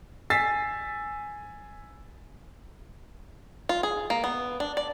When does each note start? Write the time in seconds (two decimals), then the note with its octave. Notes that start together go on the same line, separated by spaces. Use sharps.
0.30 G#5 E6 A6 B6 C7
3.69 F4
3.83 G#4
4.10 A#3
4.24 B3
4.60 D4
4.77 D5